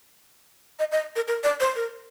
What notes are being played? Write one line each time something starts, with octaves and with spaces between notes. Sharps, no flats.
D#5
D#5
A#4
A#4
D5
C5
A#4